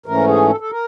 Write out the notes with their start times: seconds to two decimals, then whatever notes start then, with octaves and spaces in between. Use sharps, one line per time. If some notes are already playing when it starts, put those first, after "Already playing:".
0.06 G#2 E3 A3 C#4 A#4
0.27 G#4
0.49 A4
0.60 A4
0.71 A#4